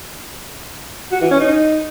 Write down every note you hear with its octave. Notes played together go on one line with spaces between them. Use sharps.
F#4
E3
C#4
D#4